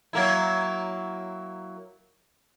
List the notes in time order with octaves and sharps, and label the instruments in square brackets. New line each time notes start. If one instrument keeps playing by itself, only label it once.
[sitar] F#3 A#3 E4